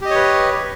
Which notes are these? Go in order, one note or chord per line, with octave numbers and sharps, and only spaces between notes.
G4 B4 C#5 D#5